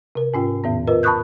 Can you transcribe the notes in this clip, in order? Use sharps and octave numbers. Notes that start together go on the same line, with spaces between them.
C3 A#4
G#2 C#4 F4 G5
E2 A2 D#3 B3
F4 A#4 B4 D#5
A5 B5 C#6 D#6 F#6 G6